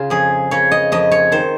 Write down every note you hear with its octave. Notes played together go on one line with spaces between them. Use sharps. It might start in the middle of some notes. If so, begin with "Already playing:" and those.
Already playing: C#3 F4
F2 G#4
C#3 C#5
D#5
F2 D#5
C#5
D#3 C5